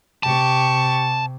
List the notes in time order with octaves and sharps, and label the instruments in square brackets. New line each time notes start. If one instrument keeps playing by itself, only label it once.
[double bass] C3 [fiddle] G4 C#6 [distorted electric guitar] A5